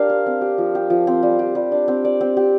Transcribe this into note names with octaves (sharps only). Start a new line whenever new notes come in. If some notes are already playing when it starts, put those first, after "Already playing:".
Already playing: D4 G4 A#4 F5
C5
C4
G4
F3
G4
F3
C4
G3
G4
G3
D4
C4
D5
C4
G4